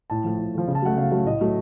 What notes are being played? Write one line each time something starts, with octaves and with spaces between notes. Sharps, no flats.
A2 A5
F3 A3
A2
F3 A3
C#3
A5
F#3 A3 F#5
C#3 F5
F#3 A3
A2 D#5
F#3 A3